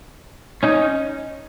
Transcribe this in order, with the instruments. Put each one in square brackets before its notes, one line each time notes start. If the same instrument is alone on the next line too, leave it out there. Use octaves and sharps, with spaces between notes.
[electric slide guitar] C#4 D#4